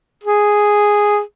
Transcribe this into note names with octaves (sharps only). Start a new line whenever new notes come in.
G#4